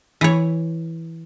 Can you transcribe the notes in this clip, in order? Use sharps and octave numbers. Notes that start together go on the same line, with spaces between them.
E3 C#5